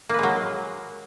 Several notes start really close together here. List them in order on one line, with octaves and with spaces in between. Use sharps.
A#3 B4 G#3 F#3